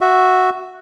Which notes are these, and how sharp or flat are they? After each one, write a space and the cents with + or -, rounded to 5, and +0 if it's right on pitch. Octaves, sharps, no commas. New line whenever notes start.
F#4 +0 E5 +0